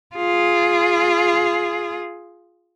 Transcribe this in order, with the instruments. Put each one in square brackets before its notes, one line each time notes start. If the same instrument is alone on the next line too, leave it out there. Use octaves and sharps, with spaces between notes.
[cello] F4 G#4